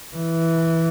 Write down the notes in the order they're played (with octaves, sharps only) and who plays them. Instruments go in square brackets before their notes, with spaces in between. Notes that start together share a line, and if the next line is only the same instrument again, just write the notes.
[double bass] E3